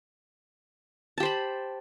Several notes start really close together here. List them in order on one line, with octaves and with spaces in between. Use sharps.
A5 G4 C5 B5